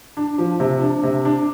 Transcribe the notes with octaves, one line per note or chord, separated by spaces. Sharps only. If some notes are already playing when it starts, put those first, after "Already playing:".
D4
F3
C3
D4
C3
D4